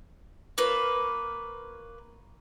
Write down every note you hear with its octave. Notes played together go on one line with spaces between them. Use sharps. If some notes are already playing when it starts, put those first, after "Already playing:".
A#3 F4 B4 C#5